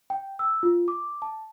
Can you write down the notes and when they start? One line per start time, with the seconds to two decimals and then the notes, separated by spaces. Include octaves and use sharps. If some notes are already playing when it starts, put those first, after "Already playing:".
0.10 G5
0.39 E6
0.63 F4
0.88 D6
1.22 A5